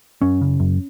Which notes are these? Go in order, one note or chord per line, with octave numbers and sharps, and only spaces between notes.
F#2 C#4
C#3
F#2